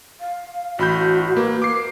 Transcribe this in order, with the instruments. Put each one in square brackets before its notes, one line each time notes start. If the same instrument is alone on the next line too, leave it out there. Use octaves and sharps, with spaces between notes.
[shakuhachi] F5
[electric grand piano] A1 B5 G6 [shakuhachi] F#4
[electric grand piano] A#3 [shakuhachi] B4
[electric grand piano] D6 C7